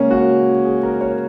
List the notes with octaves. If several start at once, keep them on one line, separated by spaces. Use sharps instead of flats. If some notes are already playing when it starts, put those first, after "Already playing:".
Already playing: C#3 G#3 A#3 C#4
F#4
G#4
A#4
C#5